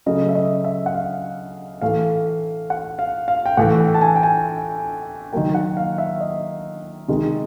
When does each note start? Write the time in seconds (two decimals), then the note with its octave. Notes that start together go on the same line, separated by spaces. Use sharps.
0.06 C#3 F#3 A3 D#5
0.29 E5
0.35 D#5
0.64 E5
0.86 F#5
0.95 F5
1.82 A2 E3 A3 F5
2.70 F#5
2.99 F5
3.28 F5
3.46 G5
3.57 A2 E3 A3 F#5
3.79 G5
3.94 A5
4.01 G#5
4.16 G5
4.23 G#5
5.33 D#3 F#3 A#3 G5
5.54 F#5
5.77 F5
5.98 E5
6.20 D#5
7.08 C3 D#3 G#3